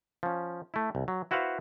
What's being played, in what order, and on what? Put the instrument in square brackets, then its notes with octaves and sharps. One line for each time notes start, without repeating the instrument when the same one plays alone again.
[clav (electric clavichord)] F3 C#4
A3 E4
C2
F#3
E4 F#4 B4 C5 F5 F#5